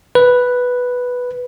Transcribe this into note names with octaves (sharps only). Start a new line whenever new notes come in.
B4